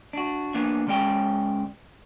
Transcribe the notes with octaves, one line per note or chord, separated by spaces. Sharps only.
D4 F#4
A#3 B3 D4 F4
C#2 G#3 C#4 D5 G5